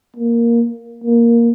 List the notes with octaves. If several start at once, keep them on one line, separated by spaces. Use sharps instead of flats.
A#3
A#3